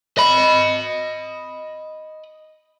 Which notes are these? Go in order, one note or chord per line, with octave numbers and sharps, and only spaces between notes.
D#5 B5